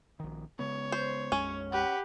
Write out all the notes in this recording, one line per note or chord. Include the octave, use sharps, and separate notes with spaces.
A#1 D#3
C#3 G#3 B3 C#5
C5
B1 F#2 G#3 C#4
G4 B4 F#5